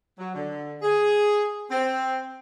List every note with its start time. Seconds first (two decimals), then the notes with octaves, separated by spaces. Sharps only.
0.18 F#3
0.35 D3
0.82 G#4
1.71 C4